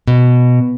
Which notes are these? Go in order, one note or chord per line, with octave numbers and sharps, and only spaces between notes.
B2